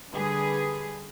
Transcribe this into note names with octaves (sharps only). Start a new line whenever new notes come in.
D3 G3 G#4 B4